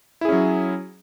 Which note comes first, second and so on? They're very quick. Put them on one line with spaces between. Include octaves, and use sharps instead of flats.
E4 G#4 C#4 F#3